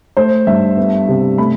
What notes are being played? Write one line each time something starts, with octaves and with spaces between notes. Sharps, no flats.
A3 C5
G2 E5
B3
C3
A3 B5